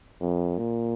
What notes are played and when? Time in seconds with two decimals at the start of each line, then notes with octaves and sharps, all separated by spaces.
0.20 F2
0.58 A#2